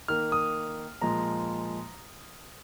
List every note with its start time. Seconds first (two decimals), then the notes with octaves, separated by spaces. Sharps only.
0.08 D#3 A#3 F6
0.32 D#6
1.01 A#2 F3 G#3 A#5